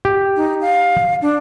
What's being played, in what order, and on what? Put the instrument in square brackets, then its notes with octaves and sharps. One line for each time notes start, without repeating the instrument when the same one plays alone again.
[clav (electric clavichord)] G4
[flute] D#4
F5
D4